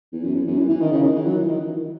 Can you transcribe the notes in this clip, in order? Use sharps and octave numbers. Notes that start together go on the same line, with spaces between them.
E2
F#2
E2
F#2
E3
E3
D#3
C#3
D#3
E3
F#3
E3
D#3
E3